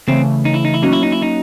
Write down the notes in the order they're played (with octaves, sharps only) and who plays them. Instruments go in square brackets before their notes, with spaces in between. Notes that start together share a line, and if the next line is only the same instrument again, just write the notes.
[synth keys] C#3 E3 A3 [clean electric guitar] C4
[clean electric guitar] D#4
E4
D#4
E4
[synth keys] F#3 A#3 C#4 F#4 [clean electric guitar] D#4
[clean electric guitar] E4
D#4
E4
D#4